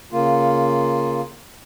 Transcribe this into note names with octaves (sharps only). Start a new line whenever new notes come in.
C#3 A#3 F4